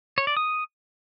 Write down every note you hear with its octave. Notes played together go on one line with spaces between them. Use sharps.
C#5
D5
D#6